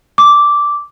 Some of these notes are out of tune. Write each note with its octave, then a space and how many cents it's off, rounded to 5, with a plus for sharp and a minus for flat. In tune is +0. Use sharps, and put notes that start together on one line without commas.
D6 -10